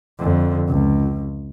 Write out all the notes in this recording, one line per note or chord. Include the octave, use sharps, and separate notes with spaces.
F2 D3
C#2